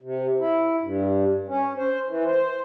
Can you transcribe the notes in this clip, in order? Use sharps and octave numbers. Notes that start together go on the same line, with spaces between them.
C3
E4
G2
C#4
C5
E3
C5